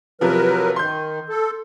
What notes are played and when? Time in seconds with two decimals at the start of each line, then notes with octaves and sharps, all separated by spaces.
0.21 C3 F3 F#3 A#4 B4
0.76 D#3 C6 G6
1.29 A4